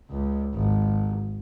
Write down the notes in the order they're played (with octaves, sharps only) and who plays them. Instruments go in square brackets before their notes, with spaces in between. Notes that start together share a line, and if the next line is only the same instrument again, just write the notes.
[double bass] C#2
G#1